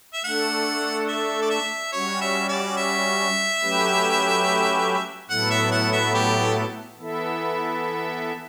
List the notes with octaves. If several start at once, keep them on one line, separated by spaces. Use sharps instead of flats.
E5
A3 D4 A4 F#5
E5
D5
E5
G3 C#4 F#4 C#5
E5
D5
E5
F#3 A3 C#4 G4 B4
A2 F#3 B3 E4 A4 F#5
E5
F#5
E5
G4
E3 B3 E4 A4 E5